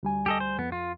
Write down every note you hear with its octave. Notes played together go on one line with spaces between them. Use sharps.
D2 G3 G#5
G4 A4 D#5
C5
F2 B3
F4